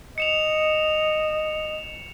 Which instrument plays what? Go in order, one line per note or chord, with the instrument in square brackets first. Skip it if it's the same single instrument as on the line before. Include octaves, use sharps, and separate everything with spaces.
[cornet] D#5 [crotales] C#7 E7 F7